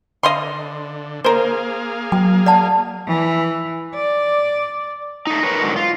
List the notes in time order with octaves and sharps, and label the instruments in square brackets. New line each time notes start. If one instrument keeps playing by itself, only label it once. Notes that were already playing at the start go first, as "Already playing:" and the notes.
[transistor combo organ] D3 [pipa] D#5 F5 C6
[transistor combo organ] A#3 G#4 F5 [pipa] A#4 C5
[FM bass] F#3 [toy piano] G5
[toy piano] D5 F#5 A5
[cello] E3
D5
[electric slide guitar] A3 D#4
A#4 B4 C#5
G#2 D3 D#3 F#3
F4